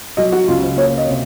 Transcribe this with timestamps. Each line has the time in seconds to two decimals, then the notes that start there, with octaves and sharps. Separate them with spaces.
0.17 F#3 D#5
0.32 F#4
0.48 C#2 F4
0.63 C5
0.77 A#3 C#5
0.98 D#5
1.07 C3